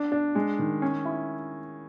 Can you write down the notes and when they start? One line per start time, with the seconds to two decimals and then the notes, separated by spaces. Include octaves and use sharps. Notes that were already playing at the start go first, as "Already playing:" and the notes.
Already playing: D4
0.12 D4
0.35 G#3
0.59 D#3
0.82 C#4
1.05 E4